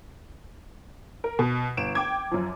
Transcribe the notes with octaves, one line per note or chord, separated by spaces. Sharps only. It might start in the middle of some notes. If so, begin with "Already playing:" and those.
A#4
B2
G1 D7 E7
G5 D6 G#6
F#2 F3